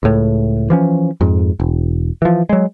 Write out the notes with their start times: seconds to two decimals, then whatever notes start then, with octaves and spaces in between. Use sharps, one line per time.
0.03 C#2 A2
0.70 E3 F3 C#4
1.21 F2 G#2
1.60 E1
2.22 E3 F3
2.49 F#3 G#3